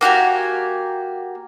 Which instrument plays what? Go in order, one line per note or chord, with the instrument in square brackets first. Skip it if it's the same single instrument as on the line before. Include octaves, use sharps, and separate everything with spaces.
[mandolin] A#3 F#4 G4 G#5